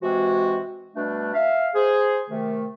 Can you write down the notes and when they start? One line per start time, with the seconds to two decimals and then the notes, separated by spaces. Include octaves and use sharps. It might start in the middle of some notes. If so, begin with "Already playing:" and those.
0.02 C3 E3 G#3 C4 F#4
0.95 B2 G3 A3 D4
1.33 E5 F5
1.75 G#4 C5
2.30 C3 D#3 A3